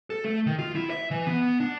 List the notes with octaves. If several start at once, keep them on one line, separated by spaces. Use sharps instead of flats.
A4
A3
D#3
F4
E4
E5
E3
B3
D4